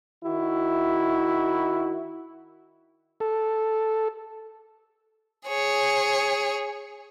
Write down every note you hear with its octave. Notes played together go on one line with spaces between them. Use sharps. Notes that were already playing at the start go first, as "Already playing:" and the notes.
D#3 E4 F#4
A4
G#4 C#5